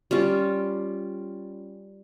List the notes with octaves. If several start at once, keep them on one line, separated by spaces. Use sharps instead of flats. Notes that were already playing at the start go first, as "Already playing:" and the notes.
G3 C#4 F4